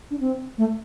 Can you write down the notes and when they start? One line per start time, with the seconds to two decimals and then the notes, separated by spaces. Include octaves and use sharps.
0.11 D4
0.20 C4
0.58 A3